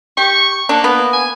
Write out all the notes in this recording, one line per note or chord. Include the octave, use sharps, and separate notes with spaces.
G4 C#6
A#3 D4
B3
G#5